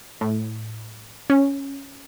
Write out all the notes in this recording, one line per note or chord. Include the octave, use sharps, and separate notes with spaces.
A2
C#4